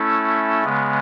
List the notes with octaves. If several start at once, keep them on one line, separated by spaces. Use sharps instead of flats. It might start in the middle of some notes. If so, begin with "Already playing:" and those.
Already playing: A3 C#4 E4 A4
C#3 G#3 B3